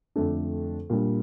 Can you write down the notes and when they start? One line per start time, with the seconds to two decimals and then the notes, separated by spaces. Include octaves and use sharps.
0.16 F2 D3 A3 D4
0.90 A#2 G3 D4